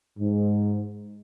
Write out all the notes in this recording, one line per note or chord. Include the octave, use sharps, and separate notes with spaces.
G#2